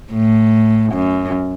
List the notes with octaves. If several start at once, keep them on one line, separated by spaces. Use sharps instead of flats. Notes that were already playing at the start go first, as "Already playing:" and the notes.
A2
F#2